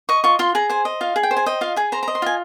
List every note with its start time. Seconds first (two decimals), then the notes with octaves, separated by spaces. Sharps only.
0.09 D#5 C#6
0.24 F4 C#6
0.39 F4 C6
0.55 G#4 A#5
0.70 C5 G#5
0.85 D#5
1.01 F4 F5
1.16 G#4
1.23 G5
1.31 C5
1.37 G#5
1.46 D#5 G5
1.61 F4 F5
1.76 G#4 G#5
1.92 C5 A#5
2.03 A#5
2.08 D#5
2.15 C6
2.22 F4 G#5